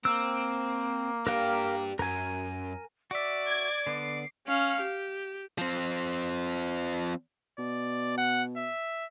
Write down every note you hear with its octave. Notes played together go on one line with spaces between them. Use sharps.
A#3 C4 E6
D4 G4 A#4 F5
F#2 A#4 G#5
F#4 D5 E5 D6
G#6
D3 B3 C7
C#4 F5
G4
F3 C4
B2 D5
F#5
E5